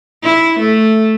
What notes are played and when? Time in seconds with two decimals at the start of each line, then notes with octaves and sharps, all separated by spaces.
0.24 E4
0.59 A3